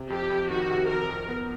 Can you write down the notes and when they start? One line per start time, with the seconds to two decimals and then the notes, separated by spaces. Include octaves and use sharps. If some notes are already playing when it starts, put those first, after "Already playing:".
Already playing: C3
0.10 F2 G4
0.30 F2
0.50 D#3 F#4
0.70 C3
0.89 F2 A#4
1.09 F2
1.29 B3